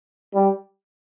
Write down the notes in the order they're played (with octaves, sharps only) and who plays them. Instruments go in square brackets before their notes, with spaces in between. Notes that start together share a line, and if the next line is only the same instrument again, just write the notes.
[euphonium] G3